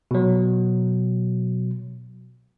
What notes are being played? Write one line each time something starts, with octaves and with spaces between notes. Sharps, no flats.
B2 F#3